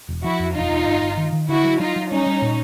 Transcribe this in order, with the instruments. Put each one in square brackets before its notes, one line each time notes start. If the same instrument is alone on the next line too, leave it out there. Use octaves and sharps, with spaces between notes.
[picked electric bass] E1
[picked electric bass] F3 [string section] E4 F#4
[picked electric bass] F2
[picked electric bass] E1 [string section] D#4 F4
[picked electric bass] E1
G1
G1
D#3
D#3
[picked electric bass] D3 [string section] E4 F#4
[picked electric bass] F#3
[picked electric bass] F#3 [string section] D#4 F4
[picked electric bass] F#3
[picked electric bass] G3 [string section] C#4 D#4
[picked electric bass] G3
A#2